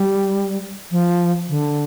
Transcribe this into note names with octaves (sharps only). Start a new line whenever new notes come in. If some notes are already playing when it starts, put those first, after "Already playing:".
Already playing: G3
F3
D3